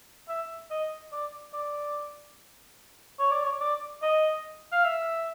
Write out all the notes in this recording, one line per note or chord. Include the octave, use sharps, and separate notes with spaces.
E5
D#5
D5
D5
C#5
D5
C#5
D5
D#5
F5
E5